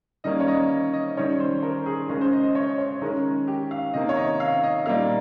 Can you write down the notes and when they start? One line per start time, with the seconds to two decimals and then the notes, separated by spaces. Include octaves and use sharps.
0.24 D#3 G3 A#3 C#4 D#5
0.40 C#5
0.48 D#5
0.93 D#5
1.17 D#3 G3 C#4 C#5
1.40 C5
1.63 A#4
1.86 G#4
2.09 C#3 G#3 C#4 A#4
2.21 C5
2.33 D#5
2.44 D#5
2.55 C#5
2.78 C#5
3.01 D#3 G#3 C#4 A#4
3.48 G4
3.71 F5
3.93 C3 D#3 A#3 D#5
4.09 C#5
4.17 D#5
4.40 F5
4.63 D#5
4.86 A#2 G3 A#3 D#4 F5